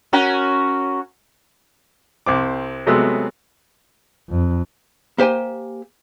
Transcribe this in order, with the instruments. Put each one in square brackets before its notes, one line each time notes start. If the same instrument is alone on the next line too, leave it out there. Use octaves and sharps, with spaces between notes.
[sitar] C#4 F#4 A#4
[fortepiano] C2 C4 D6
C3 F#3 G#3 A3 B3 E6
[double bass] F2
[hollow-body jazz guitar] A#3 G4 C5 G5 G#5